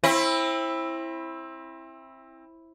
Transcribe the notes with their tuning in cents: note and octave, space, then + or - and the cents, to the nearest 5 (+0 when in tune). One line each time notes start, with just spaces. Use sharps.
C4 +30 E4 +0